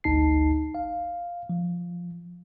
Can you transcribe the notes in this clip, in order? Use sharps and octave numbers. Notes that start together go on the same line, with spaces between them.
G#1 D2 D#4 A5 C7
F5
F3